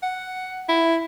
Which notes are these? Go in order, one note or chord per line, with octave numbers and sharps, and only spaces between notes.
F#5
E4